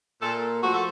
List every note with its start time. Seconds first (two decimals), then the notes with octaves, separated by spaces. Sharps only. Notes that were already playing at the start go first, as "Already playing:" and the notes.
0.22 A#2 A4
0.62 F3 A3 F#4
0.73 A4